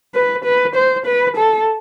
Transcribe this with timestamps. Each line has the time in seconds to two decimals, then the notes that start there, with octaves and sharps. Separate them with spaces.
0.14 B4
0.44 B4
0.75 C5
1.06 B4
1.37 A4